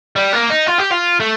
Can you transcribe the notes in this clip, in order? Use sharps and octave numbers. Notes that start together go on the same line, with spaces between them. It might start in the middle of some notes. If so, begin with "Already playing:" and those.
G3
A#3
D#4
F4
G4
F4
A3